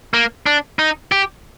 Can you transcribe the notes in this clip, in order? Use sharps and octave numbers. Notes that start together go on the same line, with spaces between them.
A#3
D4
D#4
G4